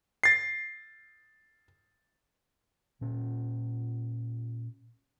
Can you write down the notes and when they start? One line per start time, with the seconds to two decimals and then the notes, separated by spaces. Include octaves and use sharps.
0.24 A6 C7
3.01 A#2 C#4